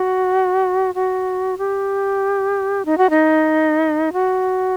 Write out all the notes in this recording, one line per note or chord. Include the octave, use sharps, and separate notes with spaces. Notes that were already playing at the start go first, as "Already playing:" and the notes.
Already playing: F#4
F#4
G4
D#4
F#4
D#4
F#4